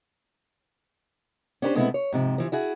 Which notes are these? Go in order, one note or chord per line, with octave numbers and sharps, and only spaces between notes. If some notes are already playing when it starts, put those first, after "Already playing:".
C#4 D4 G4 B4 C5
B2 G#3 A3 B3 C4 E4
C#5
G#2 C3 F3
E3 F3
E4 F#4 G#4